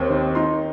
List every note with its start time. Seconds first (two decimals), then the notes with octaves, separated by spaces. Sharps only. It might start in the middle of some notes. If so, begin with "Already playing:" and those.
Already playing: D#2 C4
0.10 D#3
0.35 D#4 C6